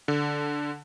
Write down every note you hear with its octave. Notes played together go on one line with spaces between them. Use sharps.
D3